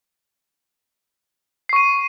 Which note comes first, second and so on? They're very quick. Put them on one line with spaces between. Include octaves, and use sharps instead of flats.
C7 C#6 D#7